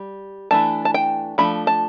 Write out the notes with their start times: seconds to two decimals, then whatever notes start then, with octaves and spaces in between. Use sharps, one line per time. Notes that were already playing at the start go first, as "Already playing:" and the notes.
Already playing: G3
0.51 E3 A3 D4 A5
0.85 A5
0.94 G5
1.38 F3 A3 D4 B5
1.67 A5